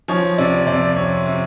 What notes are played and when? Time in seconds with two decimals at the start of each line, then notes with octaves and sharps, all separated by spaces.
0.08 F3 C#5
0.38 C3 D5
0.66 F2 D5
0.96 C3 C#5
1.26 C3